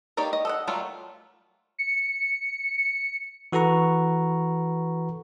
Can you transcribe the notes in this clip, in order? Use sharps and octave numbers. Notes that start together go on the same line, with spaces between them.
A#3 D#4 G4 C#5 D5
D#5
A4 D#5 F#5
F#3 G3 A3 A#3 F4
C#7
E3 F#4 A4 B4 A#5 C#6